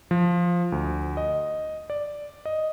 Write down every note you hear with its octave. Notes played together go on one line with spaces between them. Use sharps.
F3
D2
D#5
D5
D#5